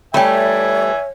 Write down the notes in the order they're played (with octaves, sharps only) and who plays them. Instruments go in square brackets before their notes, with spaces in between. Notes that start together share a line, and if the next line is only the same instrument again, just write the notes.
[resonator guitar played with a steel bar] G3 A3 [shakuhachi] C#5 [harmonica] E5 G#5 [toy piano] G5 B5